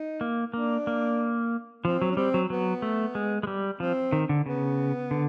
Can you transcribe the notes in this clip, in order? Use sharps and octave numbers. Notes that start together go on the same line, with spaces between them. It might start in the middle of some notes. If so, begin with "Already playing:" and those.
Already playing: D#4
A#3
A#3 D4
A#3
F3 C4
F#3
C#4
G3 C4
F#3
F#3 B3
A3
G#3
G#3
G3
F3 C4
D#3
D3
C#3 B3
D3